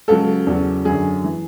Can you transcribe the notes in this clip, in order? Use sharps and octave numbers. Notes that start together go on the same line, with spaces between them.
C#2 C#3 F#3 A4
E2 C#3 F#3
F#2 D3 F#3 G#4
E3